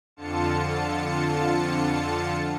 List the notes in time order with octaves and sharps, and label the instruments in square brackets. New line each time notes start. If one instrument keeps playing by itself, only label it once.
[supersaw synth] F2 D3 F4 A5 C#7